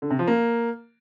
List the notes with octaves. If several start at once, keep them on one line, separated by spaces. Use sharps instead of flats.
D3
C3
F3
A#3